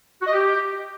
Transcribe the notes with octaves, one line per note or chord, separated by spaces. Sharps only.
F#4
D#5
G4